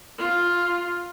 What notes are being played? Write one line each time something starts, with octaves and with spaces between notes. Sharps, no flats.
F4